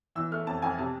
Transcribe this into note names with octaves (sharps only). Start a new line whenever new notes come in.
E3 E6
A3 F6
F2 A5
F2 G#5
C3 A5